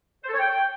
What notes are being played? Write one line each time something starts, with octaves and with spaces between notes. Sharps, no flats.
C5
A4
C#5
G5